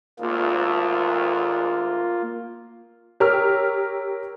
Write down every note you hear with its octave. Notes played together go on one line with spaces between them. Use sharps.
G#1 D2 A#3 F4
G4 A#4 C#5 E6 F6